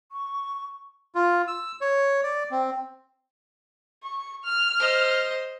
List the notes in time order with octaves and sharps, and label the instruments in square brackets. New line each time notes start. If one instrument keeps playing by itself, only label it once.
[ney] C#6
[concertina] F4
E6
C#5
D5
C4
[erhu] C#6
F6
[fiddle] C5 D#5